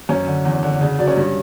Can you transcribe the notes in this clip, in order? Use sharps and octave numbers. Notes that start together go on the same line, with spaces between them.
F#2 C#4
D3
E2
D3
C#3 D4
F#3 D4 D5
C#4 C#5
G2